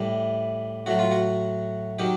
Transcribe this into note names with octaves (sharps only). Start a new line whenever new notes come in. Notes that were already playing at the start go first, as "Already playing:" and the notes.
Already playing: A2 E3 G3
A2 F#3 F#4
F4
F#4
D#3 F#3 G4